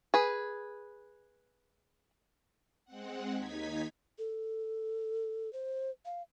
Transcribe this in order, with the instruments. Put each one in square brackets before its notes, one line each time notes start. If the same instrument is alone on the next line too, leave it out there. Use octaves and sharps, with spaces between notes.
[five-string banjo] G#4 B4
[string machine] G#3 C4 F#5
D#2 D#4 G#6 B6
[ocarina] A4
C5
F5